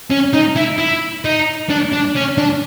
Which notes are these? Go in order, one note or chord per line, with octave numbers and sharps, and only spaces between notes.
C#4
D#4
E4
E4
D#4
D4
D4
C#4
D4